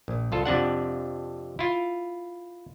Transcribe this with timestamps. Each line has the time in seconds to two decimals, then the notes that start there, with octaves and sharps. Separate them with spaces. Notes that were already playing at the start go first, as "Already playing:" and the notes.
0.08 A#1
0.32 C2 F4 A4
0.45 F2 C3 D4 F#5
1.59 E4 F4